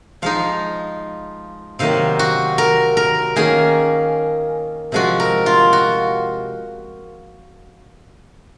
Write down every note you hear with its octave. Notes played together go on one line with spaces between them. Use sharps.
F3 G#3 D#4 F5
C3 D#3 F#3 A#3 F5
F#4
A#4
A#4
D#3 A#3 C#4 G#4
C3 F3 G#3 F#4
A#4
F4
F#4